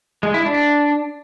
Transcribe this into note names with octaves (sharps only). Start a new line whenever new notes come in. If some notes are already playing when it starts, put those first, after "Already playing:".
G#3
E4
D4